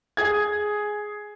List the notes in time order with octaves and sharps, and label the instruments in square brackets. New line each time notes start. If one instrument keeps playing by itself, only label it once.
[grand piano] G#4 G#6